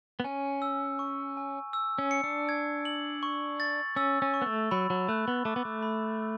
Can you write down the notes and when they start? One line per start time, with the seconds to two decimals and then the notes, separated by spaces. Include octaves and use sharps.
0.20 B3
0.24 C#4 G#5
0.62 E6
0.99 C#6
1.37 G#5
1.73 E6
1.98 C#4
2.11 C#7
2.24 D4
2.49 G#6
2.85 F#7
3.23 C#6
3.60 A6
3.96 C#4 E6
4.22 C#4
4.34 C#6
4.42 B3
4.46 A3
4.71 F#3 B5
4.90 F#3
5.09 A3 F#6
5.28 B3
5.45 A3 D6
5.56 B3
5.65 A3
5.82 B5